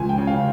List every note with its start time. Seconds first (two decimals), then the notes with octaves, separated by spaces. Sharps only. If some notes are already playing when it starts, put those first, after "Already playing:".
Already playing: C#2 F3 G#5
0.09 G5
0.18 C#3
0.27 F5